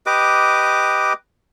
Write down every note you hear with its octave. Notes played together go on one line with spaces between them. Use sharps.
G4 B4 D#5 D6